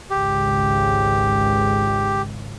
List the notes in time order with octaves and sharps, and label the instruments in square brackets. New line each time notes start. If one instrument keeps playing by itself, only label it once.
[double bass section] G#1 C#2 C#3 [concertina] G4